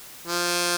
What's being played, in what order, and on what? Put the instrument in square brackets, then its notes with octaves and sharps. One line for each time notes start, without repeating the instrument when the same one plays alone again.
[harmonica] F3